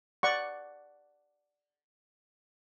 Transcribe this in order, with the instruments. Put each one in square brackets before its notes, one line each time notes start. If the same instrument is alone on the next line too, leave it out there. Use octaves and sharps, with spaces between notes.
[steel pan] D5 F#5 C#6